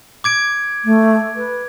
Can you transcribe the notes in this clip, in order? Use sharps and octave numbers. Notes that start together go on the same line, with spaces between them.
D6 G#6 D7
A3
B4